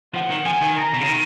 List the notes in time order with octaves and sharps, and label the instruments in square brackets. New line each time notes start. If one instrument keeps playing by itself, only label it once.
[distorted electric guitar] F3 [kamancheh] F#5
[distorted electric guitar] D#3
[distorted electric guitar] F3 [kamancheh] G#5
[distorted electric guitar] D#3
[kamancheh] A#5
[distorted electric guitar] B2
C#3
D#3